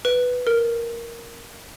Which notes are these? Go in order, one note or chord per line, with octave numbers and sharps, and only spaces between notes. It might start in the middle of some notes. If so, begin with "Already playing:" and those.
B4
A#4